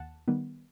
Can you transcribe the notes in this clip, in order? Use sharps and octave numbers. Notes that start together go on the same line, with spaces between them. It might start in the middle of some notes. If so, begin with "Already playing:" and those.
Already playing: D#2 F#5 A5
D#3 G3 B3